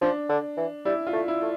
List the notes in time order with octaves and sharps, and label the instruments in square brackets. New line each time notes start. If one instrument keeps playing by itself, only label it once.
[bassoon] F3 [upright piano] D4
[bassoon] D3
E3
[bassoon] G3 [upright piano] E4
[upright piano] F4
[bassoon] A3
[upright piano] E4
[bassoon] A3